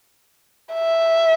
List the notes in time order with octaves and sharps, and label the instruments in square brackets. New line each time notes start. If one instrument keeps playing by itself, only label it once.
[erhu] E5